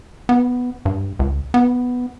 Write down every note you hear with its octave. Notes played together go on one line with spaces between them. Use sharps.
B3
G2
C#2
B3